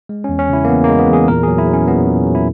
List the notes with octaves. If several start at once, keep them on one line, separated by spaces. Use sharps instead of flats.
G#3
E2 C#4
C#4
C#3 E4
A#3
E2 B3
G#3 A#3
B3
E2
G#4
A#2 A#4
F#3 G#4
E4
F#3
C#4
A#2 B3
A#2
F#3
E4